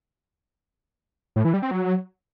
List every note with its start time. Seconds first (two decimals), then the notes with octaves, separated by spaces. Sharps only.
1.36 A2
1.45 E3
1.54 G3
1.62 C4
1.71 F#3